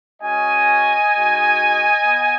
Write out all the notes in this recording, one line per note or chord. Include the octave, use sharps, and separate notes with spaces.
G#3 C#4 F#4 D#5 G#5
G#3 D#4 F#4
B3